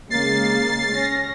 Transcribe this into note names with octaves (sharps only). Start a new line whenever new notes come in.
C#3 G#3 A#3 A6 C7
C#4 A#6